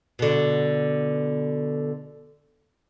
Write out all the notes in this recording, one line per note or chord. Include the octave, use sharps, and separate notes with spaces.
B2 D3